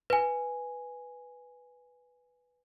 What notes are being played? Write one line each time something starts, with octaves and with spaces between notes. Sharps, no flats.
B4 G#5